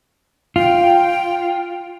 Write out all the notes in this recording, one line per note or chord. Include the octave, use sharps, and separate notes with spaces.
F4 G5